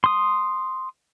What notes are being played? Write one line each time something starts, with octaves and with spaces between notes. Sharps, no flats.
C6 D#6